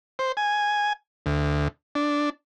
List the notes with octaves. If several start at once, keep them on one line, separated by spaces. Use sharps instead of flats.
C5
G#5
D2
D4